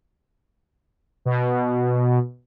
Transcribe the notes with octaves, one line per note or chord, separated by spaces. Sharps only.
B2